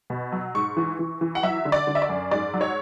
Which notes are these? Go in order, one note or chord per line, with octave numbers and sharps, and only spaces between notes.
B2
F#3
G#2 C#6
E3
E3
E3
F#5
F#3 E5
D3
D5
D3
E5
D5
F#2
G#2 D5
F#3
C#5